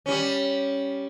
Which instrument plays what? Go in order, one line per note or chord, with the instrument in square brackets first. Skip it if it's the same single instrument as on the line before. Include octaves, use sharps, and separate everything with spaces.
[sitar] G3 C#4